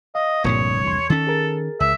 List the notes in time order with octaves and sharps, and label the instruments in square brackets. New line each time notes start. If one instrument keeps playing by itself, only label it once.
[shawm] D#5 [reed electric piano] F5
[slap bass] F1 C2 D3 [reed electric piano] G2 A#2 D#6 [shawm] C#5
[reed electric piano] E2 C6
[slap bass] D#3 C#4 [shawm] A4
[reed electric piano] G#4 A#4 A6
[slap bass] C#2 [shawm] E5